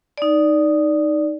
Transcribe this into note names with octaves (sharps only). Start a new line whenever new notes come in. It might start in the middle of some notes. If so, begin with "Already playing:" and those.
D#4 D5